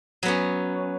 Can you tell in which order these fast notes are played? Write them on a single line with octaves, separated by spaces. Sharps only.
F#3 B3 C#4